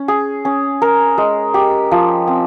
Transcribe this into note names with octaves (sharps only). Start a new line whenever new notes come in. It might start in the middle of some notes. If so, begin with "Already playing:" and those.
Already playing: C#4
G#4
C#4
A#4
G#3
G4
F3
C4